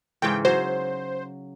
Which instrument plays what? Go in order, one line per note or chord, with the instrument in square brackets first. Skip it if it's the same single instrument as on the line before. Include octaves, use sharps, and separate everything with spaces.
[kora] G#2 C#3 E3 [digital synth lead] G5
[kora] F#3 [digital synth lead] C5